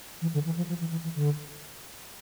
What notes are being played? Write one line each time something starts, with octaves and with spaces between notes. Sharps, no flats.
E3
D3
E3
F3
F3
E3
E3
E3
D3